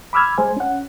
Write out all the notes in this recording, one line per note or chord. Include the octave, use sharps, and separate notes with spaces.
B5 D6 E6 F6 G#6
G#3 C5 G#5
C#4 F#5